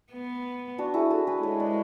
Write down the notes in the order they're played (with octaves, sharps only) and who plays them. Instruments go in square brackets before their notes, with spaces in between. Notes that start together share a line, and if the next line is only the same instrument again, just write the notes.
[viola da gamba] B3
[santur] D4 F#4
E4 G#4
F#4 A4
G#4 B4
[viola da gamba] G#3 [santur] A4 C#5
[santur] B4 D5